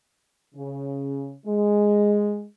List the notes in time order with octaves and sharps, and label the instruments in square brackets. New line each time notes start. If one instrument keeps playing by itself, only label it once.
[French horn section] C#3
G#3